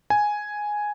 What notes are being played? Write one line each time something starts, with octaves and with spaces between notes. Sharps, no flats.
G#5